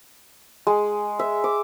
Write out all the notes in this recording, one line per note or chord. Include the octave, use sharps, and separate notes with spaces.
G#3
E5
D6